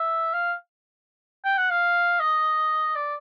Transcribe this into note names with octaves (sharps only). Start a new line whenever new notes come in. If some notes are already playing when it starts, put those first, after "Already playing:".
Already playing: E5
F5
G5
F#5
F5
D#5
D5